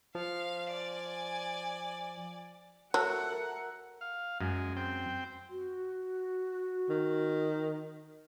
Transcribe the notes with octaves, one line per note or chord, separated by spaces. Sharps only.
F3 F5
D5 G#5
F#3 A4 A#4 C5 E5 F#5
A#4
F5
F#2 G#3
C4 G5
F#4
D#3